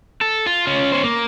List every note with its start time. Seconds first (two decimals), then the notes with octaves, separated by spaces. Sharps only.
0.21 A4
0.46 F4
0.67 C#4 F4
0.92 C#4 C5
1.04 A#3